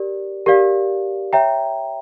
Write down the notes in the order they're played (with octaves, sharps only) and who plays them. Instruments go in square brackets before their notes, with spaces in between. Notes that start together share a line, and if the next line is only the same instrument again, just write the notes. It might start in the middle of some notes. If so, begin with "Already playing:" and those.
Already playing: [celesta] G4 A#4 D5
G4 A#4 D5 F5
C#5 E5 G5 A#5